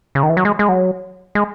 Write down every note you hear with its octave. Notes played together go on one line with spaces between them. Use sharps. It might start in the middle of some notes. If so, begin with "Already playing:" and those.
C#3
D#3
E3
F#3
G#3
G#3
F#3
G#3